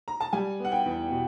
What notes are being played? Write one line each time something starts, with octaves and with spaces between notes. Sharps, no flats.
A#5
A5
G3 G#5
B3
F#5
G5
E2
B2